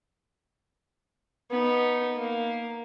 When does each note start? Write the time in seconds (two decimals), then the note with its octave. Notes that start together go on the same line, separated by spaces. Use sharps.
1.51 B3 D#4
2.17 A#3